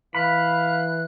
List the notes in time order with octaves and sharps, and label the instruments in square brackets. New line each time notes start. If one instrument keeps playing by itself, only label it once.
[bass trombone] E3 [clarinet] F5 [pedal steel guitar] B5 [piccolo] F#6